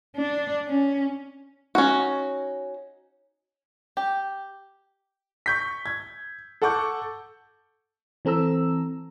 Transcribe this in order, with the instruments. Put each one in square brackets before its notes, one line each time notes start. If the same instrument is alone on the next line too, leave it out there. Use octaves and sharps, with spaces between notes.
[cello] D4
C#4
[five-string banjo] C#4 D#4 F#4
G4
[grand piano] C#6 G6 B6
G#6
A4 F#5 A5 C#6 D6 G6
[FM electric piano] E3 C4 A4 A#5 E6